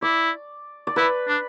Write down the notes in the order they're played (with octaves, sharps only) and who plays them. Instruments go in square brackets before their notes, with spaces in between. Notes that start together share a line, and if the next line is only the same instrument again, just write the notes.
[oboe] E4 [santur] D5
[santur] D5
[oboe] E4 [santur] B4
[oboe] D4